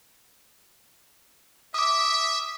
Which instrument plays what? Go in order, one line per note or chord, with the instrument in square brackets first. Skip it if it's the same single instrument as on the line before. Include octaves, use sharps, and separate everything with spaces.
[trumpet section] E5 [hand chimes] D6 D#6